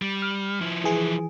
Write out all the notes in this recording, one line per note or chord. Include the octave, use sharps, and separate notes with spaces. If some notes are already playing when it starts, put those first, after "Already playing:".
G3
F6
F3 E4
E3 G#4